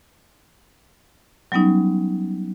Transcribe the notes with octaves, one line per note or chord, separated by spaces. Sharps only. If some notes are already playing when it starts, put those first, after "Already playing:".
F#3 G3 B3 C#4 D#4